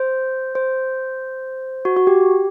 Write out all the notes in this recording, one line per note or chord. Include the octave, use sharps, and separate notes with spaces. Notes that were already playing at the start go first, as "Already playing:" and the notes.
Already playing: C5
C5
F#4
F#4
G4